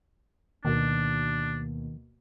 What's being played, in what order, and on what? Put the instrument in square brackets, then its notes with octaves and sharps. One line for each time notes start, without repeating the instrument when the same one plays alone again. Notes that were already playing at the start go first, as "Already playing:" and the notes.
[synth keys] D2 B2 A#3 [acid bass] D#3 [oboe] D4